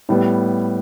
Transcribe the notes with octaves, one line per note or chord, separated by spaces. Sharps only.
A2 G3 B3